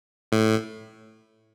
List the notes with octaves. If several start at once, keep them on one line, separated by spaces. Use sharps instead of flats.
A2